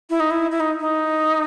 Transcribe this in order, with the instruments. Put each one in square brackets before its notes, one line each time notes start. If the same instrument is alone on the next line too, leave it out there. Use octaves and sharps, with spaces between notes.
[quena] E4
D#4
E4
E4
D#4
D#4